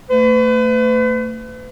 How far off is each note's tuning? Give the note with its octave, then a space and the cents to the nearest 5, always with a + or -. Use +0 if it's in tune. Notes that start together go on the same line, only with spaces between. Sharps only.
A3 +30 B4 +40